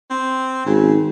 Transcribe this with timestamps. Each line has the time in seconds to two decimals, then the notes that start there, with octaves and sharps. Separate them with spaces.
0.11 C4
0.66 G#1 C#3